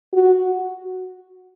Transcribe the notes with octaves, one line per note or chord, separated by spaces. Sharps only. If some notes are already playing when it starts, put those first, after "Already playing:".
F#4